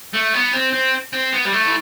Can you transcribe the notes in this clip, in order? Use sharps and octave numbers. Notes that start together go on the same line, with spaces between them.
A3
B3
C4
C4
C4
B3
G3
A3
E3